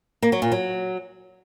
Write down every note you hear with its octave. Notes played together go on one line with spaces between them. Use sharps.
A#3
F#3
A#2
F#3